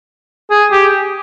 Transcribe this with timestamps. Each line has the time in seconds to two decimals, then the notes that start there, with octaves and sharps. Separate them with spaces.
0.50 G#4
0.71 G4